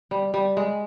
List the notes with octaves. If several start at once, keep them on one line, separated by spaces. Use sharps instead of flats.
G3
G3
G#3